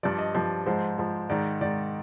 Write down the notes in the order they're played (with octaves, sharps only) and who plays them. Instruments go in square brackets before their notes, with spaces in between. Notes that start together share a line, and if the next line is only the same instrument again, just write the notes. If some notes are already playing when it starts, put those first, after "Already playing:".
[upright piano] G2 F3 D5
D#5
G2 F3
G#2 F3 C5
G#2 F3
G#2 D#3 D5
G#2 D#3 D5